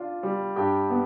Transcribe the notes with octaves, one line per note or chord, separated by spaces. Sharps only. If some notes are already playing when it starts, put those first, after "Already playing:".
Already playing: D4 F4
G3
G2 G4
B3